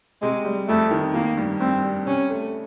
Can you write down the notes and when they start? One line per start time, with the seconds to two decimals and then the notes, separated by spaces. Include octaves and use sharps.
0.22 C3 G#3
0.45 G3
0.68 F2 A3
0.91 D#3
1.14 D#3 A#3
1.37 G2
1.60 G2 C4
1.83 G3
2.06 C3 C#4
2.30 A3